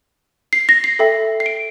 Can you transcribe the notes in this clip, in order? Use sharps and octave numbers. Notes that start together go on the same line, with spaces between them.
C7
A#6
C7
A4 E5 G5
C7
D7